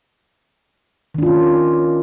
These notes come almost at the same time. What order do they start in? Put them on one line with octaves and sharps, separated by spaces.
D#3 D4 F4 C#4